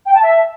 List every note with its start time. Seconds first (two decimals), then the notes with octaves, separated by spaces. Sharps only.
0.06 G5
0.14 A5
0.23 E5